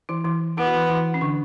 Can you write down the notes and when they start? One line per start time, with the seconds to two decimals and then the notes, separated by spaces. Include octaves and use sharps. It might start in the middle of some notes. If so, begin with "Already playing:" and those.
0.09 E3 E4
0.25 E3 E4
0.57 B3 E4
0.66 F#4
0.74 E3 E4
0.89 E3 E4
1.14 C#4
1.21 D3 D4